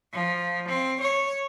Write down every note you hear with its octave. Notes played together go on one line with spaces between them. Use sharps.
F3
C4
C#5